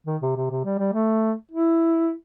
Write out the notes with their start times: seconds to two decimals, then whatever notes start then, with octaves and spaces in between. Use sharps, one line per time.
0.07 D#3
0.22 C3
0.36 C3
0.50 C3
0.65 G3
0.79 G3
0.93 A3
1.51 E4